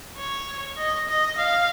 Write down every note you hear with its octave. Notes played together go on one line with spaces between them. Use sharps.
C#5
D#5
D#5
F5